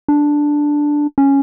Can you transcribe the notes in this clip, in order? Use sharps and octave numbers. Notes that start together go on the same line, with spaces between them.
D4
C#4